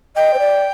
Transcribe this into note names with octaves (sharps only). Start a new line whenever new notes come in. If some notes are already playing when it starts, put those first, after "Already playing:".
D#5 G5
C5
D5